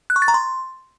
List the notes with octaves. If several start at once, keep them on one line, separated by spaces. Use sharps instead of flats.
F#6
C#6
A6
A#5
C6